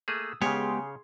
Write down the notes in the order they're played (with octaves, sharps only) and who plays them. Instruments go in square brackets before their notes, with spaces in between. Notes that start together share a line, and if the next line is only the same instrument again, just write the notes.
[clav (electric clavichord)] A3 A#3 G#4 [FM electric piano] D#6 E6
[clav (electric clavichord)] C#3 C#5 [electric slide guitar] G#3 B3 G4 [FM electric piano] G#4 G#5 C6